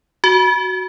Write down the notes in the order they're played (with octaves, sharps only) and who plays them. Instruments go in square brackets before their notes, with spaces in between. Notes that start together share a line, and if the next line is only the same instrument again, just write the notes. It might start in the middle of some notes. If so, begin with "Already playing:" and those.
[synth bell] F#4